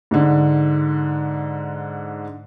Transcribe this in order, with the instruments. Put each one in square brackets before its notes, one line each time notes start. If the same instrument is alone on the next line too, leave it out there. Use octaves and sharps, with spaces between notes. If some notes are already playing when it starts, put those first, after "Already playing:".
[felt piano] G#2 D3